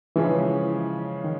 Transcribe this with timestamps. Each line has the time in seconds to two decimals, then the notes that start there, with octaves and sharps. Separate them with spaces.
0.16 C#3 E3 F3 G#3 C#4
1.24 D#3